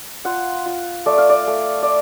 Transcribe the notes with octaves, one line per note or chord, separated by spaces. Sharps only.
F4 F#5
F4
A3 D5
F5
D5
A3
D5